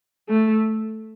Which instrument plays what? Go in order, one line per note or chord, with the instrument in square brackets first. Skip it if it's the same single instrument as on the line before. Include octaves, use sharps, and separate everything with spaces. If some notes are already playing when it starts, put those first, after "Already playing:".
[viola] A3